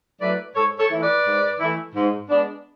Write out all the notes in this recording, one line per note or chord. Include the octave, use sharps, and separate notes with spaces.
F#3 A3 E4 B4 D5
G#2 A4 C#5
A4 C#5
E3 A3 E4
B4 D5
G#2
E3 A3 E4
G#2
G#3 B3 D4